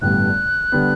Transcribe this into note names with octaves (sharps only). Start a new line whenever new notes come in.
A1 G2 D3 G3 B3 F#6
D3 G3 B3